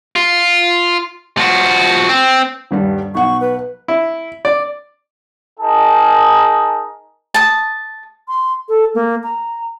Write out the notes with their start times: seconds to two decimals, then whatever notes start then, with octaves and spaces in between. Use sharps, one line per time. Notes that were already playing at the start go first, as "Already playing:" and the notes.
0.16 F4
1.37 F3 F#4
2.09 C4
2.71 D#1 G2 G3
3.15 B1 F#5 C#6
3.41 B4
3.88 E4
4.45 D5
5.59 D#4 G#4 A#4 A5
7.34 A5 D#6
8.28 C6
8.69 A4
8.95 A#3
9.24 A#5